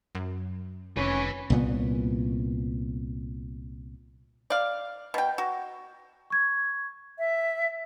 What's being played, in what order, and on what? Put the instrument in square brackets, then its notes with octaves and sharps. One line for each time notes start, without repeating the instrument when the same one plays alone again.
[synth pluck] F#2
[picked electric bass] F1 [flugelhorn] C#4 [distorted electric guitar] B4 G#5
[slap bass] C2 A#2 B3
[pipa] D5 F5
B2 G5
F#4
[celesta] C#6 G#6
[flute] E5